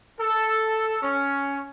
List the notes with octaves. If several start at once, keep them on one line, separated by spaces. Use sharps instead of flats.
A4
C#4